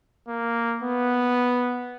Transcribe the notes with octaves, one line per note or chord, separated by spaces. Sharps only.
A#3
B3